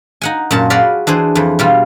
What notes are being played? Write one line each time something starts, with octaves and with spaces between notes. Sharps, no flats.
D#4 F#5 G#5
F#2 A#2 A5
F#4 G#4 D5 F5 B5
E3 D4 G#4 C5
F2 E3
B2 G3 F4